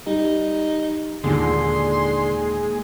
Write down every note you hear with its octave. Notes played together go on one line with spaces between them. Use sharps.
G3 D#4
D#2 A#2 D3 G#3 G#4 C6